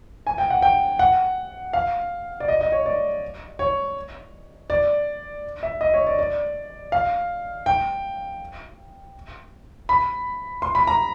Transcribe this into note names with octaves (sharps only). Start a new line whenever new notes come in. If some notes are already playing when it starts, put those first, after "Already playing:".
G#5
G5
F#5
G5
F#5
F5
D5
D#5
D#5
C#5
D5
C#5
D5
E5
D#5
C#5
D5
D5
F5
G5
B5
C6
B5
A#5